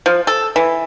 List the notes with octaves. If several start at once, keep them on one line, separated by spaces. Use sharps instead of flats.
F3
A4
E3